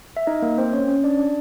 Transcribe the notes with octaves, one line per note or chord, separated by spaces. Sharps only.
E5
D#4 D#5
A#3 A#4
C4 C5
C#4 C#5
C#4 C#5
D4 D5
D4 D5